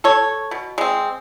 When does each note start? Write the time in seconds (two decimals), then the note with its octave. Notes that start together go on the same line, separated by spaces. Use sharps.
0.04 A4 C#5
0.51 B2
0.78 G#3 C4